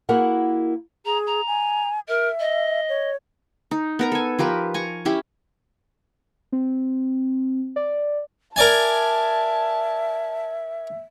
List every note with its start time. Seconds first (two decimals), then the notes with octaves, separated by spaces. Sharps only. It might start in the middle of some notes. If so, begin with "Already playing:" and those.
0.09 A#3 E4 F#4 G#4 A#4 F#5
1.05 G#4 A#5
1.26 A#5
1.47 G#5
2.08 A#4 E5
2.39 D#5
2.89 C#5
3.71 D#4
3.99 B3 A#4 A#5
4.12 A4 G#5
4.39 F3 G4 A#4 B4
4.74 G#5 A#5 C#6
5.05 C#4 E4 G4
6.52 C4
7.76 D5
8.56 A#4 D5 E5 G#5 A5